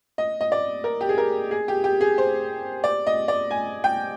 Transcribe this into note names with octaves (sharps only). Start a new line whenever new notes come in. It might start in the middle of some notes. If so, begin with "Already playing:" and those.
D#5
D#5
D5
A#4
G4
G#4
A#4
G#4
G4
G4
G#4
C5
D5
D#5
D5
G#5
G5